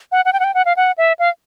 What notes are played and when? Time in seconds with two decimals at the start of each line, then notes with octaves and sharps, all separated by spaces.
0.12 F#5
0.25 F#5
0.33 G5
0.40 F#5
0.44 G5
0.54 F#5
0.65 F5
0.77 F#5
0.98 E5
1.19 F5